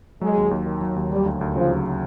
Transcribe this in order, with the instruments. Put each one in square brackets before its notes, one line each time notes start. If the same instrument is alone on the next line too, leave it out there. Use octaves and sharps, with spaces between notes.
[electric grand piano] F#3 [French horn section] G#3
[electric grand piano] D#2
D#2
D#3
F#3
D#2
[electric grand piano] F#3 [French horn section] G3
[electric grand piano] D2
D2
[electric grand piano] C#3 [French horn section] F3
[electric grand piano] F#3